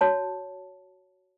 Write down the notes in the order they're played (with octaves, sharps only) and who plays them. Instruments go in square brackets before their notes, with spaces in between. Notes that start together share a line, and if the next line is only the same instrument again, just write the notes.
[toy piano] F#4 C#5 A5